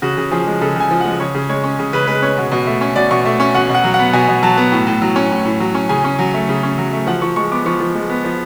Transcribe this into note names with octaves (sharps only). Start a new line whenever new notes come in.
C#3 F#4
C#3
F3 G#4
G#3
C#3 A4
C#3 G#5
F3
F#5
G#3
C#3 C#5
C#3
G#3 C#5
C#4
C#3
C#3 B4
G#3 B4
C#4 C#5
B2
B2
A3
C#4
B2 D5
B2 C#6
A3
C#4 C#6
B2 F#5
B2
F#5
F#3
F#5
B3
B2 G#5
B2
F#3 A5
B3
A2
A2
F#3
C#4
A2
A2
F#3
C#4
C#3 G#5
C#4
F#3
A3
C#3
C#4
F#3
A3
F3 F#5
F3 C#6
G#3 C#6
B3 D6
F3 C#6
F3
G#3
B3
F3